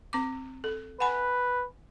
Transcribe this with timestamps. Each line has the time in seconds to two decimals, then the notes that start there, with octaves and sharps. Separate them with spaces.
0.13 C4 D6
0.64 A4
1.00 B4 F#5 G#5 B5